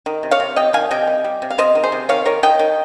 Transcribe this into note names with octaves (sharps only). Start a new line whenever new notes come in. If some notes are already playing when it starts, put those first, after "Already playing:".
D#3
C3
C#5 F5
C3
C3 D#5 G5
D#3 F5 G#5
C3 D#5 G5
G3
G3
C3
F5
C3 C5 D#5
D#3
G#4 C5
C3
D#3 C#5 F5
D#3 A#4 C#5
D#3 D#5 G5
D#3